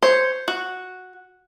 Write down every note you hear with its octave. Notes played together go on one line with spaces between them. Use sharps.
C5 C#5
F#4